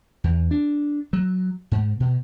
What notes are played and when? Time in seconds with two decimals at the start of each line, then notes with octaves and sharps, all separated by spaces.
0.24 E2
0.51 D4
1.13 F#3
1.72 G#2
2.00 B2